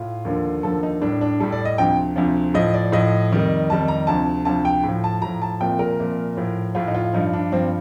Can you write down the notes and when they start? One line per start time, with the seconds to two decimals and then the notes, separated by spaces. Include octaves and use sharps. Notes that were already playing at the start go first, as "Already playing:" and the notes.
Already playing: A2 F4
0.25 D#2 D3 F3
0.63 D#2 D3 F3 A4
0.83 D#4
1.02 A2 G3 D4
1.21 D4
1.40 A2 G3 A4
1.52 D5
1.65 D#5
1.78 D2 C3 F3 G5
2.16 D2 C3 F3
2.54 A2 F3 D#5
2.74 D5
2.92 A2 F3 D#5
3.31 F2 D#3 G3
3.70 F2 D#3 G3 A5
3.88 A#5
4.07 D2 C3 F3 A5
4.45 D2 C3 F3 A5
4.65 G5
4.84 A2 F3
5.04 A5
5.22 A2 F3 A#5
5.42 A5
5.60 C2 A#2 F3 G5
5.79 A#4
5.99 C2 A#2 F3
6.37 A2 F3
6.75 A2 F3 F4
6.88 D#4
6.94 F4
7.13 G2 F3 D#4
7.33 D4
7.52 G2 F3 C4